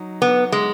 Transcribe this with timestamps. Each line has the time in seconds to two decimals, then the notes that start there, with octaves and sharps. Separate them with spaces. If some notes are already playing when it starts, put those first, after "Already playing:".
Already playing: F#3 D#4
0.22 B3
0.52 G#3